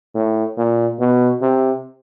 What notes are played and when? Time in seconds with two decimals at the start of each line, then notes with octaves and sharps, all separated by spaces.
0.15 A2
0.58 A#2
1.00 B2
1.42 C3